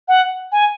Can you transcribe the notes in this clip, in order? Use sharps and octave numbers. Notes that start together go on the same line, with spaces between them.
F#5
G#5